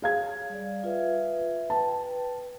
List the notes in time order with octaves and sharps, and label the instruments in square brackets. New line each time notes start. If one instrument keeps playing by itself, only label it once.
[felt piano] G#4 F5 G#6 [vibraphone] C#5
[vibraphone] G3 D5
F4 B4 E5
[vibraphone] B4 G5 [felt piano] A5